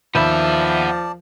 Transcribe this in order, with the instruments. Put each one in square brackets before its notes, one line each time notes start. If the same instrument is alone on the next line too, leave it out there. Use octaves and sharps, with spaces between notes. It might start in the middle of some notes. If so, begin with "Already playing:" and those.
[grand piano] D#2 B5 G6 [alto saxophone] F3 [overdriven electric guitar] B3 E5 [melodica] D5 A5